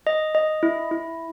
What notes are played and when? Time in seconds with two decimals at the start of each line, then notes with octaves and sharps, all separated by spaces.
0.07 D#5
0.35 D#5
0.63 E4
0.91 E4